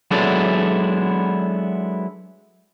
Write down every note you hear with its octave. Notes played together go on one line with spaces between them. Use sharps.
F#3 G#3 B3 D4 E4 A4